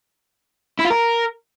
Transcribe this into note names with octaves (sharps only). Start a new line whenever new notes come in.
E4
F4
A#4